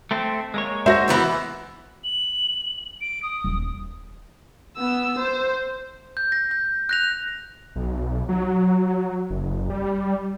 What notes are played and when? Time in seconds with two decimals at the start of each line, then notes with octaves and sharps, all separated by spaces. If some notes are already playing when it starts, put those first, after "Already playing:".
0.11 A3 C4
0.54 G#3 A#3 C#5
0.86 F#4 C5 E5 A#6
1.08 E3 B3 E4
2.04 F#7
3.01 D7
3.23 D#6
3.44 D#1
4.77 B3 E6
5.19 C5
6.17 G6
6.32 A#6
6.51 G6
6.89 F#6 A#6 F7
7.76 B1
8.29 F#3
9.30 F#1
9.70 G3